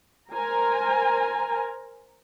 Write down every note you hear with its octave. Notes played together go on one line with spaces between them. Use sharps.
A#4 C5 G#5 A#5